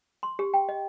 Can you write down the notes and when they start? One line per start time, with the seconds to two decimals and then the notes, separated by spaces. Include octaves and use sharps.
0.23 C6
0.39 G4
0.54 G5
0.69 D#5